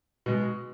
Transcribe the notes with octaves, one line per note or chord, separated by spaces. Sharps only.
B2 G#3